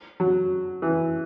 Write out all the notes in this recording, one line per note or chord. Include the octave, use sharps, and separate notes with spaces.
F#3
E3